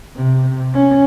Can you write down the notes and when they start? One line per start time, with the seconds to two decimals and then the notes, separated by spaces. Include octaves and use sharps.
0.16 C3
0.74 C#4